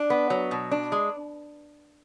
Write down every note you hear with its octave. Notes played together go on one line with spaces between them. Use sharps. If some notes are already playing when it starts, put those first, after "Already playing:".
Already playing: D4
B3
F#3
B2
D4
G#3